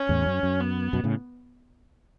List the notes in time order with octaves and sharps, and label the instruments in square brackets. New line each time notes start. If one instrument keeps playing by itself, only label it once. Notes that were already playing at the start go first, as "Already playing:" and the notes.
Already playing: [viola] C#4
[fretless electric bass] E2 A2
F#2
F#2
[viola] B3
[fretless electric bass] F#2 B2
A2 C#3